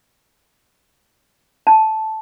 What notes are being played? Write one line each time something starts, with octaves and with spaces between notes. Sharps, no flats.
A5